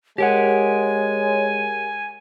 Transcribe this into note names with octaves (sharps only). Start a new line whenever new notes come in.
G#3 G4 A#4 C#5 F#5 G#5